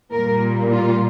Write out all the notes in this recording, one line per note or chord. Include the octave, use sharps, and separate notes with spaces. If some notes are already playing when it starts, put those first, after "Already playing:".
A#2 G3 A#3 A#4
F4